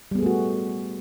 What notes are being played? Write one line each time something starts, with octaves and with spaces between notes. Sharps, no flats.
G3 A3 B3 F#4 G#4